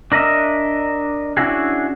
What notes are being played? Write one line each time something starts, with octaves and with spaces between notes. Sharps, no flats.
D4 A#4 D#5 E5
C#4 D4 E4 F#4 G#4